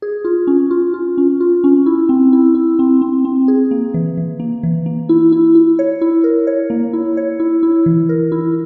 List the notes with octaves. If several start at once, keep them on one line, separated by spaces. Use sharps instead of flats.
G#4
F4
C#4
F4
F4
C#4
F4
C#4
E4
C4
E4
E4
C4
C4
C4
G#4
A#3
E3
E3
A#3
E3
A#3
E4
E4
E4
C#5
E4
A#4
C#5
A#3
E4
C#5
E4
E4
E3
A#4
E4